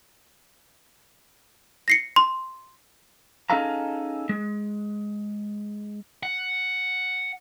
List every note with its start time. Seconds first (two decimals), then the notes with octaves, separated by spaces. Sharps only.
1.88 A#6 C7 C#7
2.16 C6
3.50 C#4 D#4 G#4 A4 F5 A#5
4.29 G#3
6.23 F#5